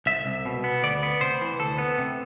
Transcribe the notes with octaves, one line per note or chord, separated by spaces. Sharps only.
C2 E5
C2
B2
B3
D2 D5
B3
C3 C5
E3
D2 A4
B3
C3